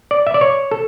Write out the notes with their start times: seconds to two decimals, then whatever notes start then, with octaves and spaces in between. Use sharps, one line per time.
0.11 D5
0.27 E5
0.34 D5
0.41 C#5
0.71 A4